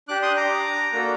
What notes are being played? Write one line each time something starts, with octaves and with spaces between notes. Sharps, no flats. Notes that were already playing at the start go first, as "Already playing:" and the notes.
D4 G4 D6 F#6
C6 D#6
A#5 D6
A#3 D4 F#4 A4